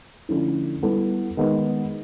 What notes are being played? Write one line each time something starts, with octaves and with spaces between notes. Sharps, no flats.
D3 F3 A3 C#4 E4
G3 B3 E4 A4
D#3 G#3 B3